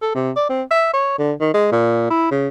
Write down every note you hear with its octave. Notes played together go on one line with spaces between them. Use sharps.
A4
C3
D5
C4
E5
C#5
D3
D#3
G#3
A#2
E4
C#3